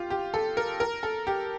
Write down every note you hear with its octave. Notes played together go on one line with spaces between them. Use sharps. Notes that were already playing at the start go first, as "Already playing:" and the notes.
Already playing: F4 G4
G4
A4
A#4
A#4
A4
G4